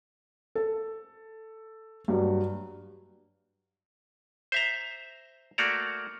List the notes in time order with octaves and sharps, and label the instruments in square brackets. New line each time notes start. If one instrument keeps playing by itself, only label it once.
[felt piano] A4
G2 F#3
[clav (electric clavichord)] C5 E5 A#5
A3 A#3 F#4 D5 A#5